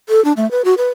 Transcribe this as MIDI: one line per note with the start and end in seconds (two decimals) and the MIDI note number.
0.09 0.23 69
0.25 0.33 62
0.37 0.49 57
0.51 0.62 71
0.65 0.74 66
0.77 0.89 71